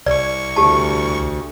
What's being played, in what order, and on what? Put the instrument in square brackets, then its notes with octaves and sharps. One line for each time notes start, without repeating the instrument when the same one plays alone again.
[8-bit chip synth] C2 C#6 [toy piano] D5
[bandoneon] D2 [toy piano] G4 A5